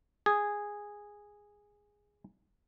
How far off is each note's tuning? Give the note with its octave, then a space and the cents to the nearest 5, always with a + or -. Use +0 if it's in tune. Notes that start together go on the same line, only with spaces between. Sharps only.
G#4 -10